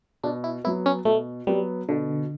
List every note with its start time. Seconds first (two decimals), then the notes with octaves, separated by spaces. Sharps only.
0.24 B2 D4
0.44 E4
0.64 F#3 B3 E4
0.86 C#4
1.05 B2 A3
1.47 F#3 G3 B3
1.89 B2 D3